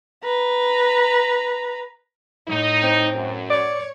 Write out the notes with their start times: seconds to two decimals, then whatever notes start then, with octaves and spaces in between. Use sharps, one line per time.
0.24 B4 A#5
2.48 A2 D#4
2.83 C4
3.15 F#2
3.50 C#5 D5